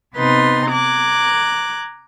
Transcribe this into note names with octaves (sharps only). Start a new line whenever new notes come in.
C3 B3 D#4 B4 C6 A6
A#5 D6 F#6 G#6